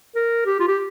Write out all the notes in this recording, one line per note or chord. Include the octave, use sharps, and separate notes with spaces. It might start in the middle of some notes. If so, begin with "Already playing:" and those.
A#4
G4
F4
G4